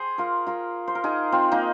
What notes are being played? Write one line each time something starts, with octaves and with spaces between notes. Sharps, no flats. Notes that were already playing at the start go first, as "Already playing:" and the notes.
Already playing: G#4 C5
F4 A#4
F4 A#4
C5
A#4
D#4 G#4
C4 F4
A#3 D#4